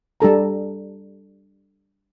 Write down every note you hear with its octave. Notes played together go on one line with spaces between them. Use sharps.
G3 D4 A4 A#5